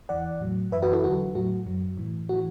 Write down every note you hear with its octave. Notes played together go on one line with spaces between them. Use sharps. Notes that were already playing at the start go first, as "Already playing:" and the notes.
E2 E3 D5 F#5
A2 F#3
F#2 E3 B4 E5
F#4 B4
E4 A4
E2 D3 F#3 F#4
A2 F#3 F#4
F#2 F#3
A2 E3
A2 E3 F#4